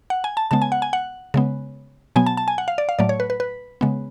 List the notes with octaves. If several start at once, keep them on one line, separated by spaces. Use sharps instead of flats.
F#5
G#5
A5
C#3 G#3 B3 A5
G#5
F#5
G#5
F#5
C#3 G#3 B3
B2 F#3 B3 G#5
A5
A5
G#5
F#5
F5
D5
F5
A2 F#3 A3 D5
C#5
B4
B4
B4
C#3 G#3 B3